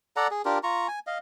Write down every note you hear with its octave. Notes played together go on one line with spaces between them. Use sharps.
A4 D5 F#5 A#5
G#4
D4 F4 G4 A#4
F4 A#5 C#6
G#5
D#5 F5